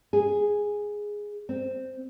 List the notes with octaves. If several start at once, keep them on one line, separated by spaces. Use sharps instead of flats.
G#4
C4